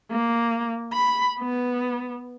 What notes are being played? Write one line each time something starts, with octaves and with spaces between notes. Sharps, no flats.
A#3
B5
B3